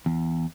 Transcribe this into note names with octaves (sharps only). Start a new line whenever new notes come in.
E2